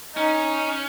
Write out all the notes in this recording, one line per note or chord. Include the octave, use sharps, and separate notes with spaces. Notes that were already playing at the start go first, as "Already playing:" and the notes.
C#4 D#4